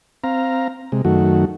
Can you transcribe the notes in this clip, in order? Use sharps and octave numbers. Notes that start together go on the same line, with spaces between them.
C4 F5 A#5
C3 G#3
F#2 D#3 A3 F#4